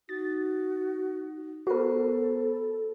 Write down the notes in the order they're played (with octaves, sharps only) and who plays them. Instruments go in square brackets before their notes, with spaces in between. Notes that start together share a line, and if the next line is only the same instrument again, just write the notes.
[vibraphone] D#4 [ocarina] F#4 [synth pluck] A6
[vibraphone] B3 C5 [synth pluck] F#4 A#4 [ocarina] A4